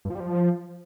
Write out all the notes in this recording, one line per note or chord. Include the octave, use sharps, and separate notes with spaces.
G2
F3
G3
F3